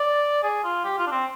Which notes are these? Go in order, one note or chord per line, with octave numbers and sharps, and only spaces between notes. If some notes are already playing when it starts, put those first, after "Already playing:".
Already playing: D5
G#4
F4
G4
F4
D4
C4